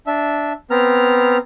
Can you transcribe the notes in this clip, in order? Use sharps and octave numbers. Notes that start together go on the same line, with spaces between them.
D4 E5
B3 C4 A#5 F6